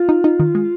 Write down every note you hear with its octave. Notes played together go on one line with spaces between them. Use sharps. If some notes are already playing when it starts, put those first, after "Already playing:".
Already playing: F4
D#4
D#4
D#3
G#3